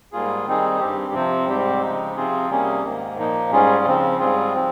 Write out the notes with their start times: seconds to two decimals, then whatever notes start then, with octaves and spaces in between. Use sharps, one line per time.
0.12 G#2 G3 A#3 F4 G#4
0.46 D#3 G3 C4 D#4 G#4
0.80 G2 G3 C4 G4
1.14 C3 F3 C4
1.48 G#2 G3 C4 G4
1.82 C#3 F3 G#3 D#4
2.16 C3 F3 C4 F4 G#4
2.49 C3 G3 A#3 C#4 G#4
2.83 G#2 D#3 A#3
3.18 A#2 F3 A#3 D#4
3.52 G#2 G3 C#4 F4 G#4
3.85 C#3 F3 C4
4.20 G#2 G3 C4 F4 G#4
4.54 F3 C4